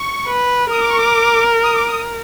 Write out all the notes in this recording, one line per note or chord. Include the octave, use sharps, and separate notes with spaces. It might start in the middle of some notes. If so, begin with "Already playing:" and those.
Already playing: C#6
B4
A#4 D#6
D6
C#6
D6
D#6
D6
D#6